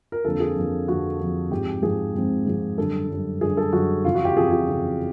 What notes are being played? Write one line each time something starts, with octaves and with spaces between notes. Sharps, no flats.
A#4
F2 D3 F3 A#3 A4
G#4
F2 D3 F3 A#3
F2 D3 F3 A#3 F#4
F2 D3 F3 A#3
G#2 F3 G#3 C4 G4
G#2 F3 G#3 C4 G#4
G#2 F3 G#3 C4
G#2 F3 G#3 C4
F#2 D3 G3 A4
F#2 D3 G3
F#2 D3 G3 G#4
A4
F#2 D3 G3 F#4
F2 C#3 E3 F4
F#4
G4
F2 C#3 E3 G#4
G#4
F2 C#3 E3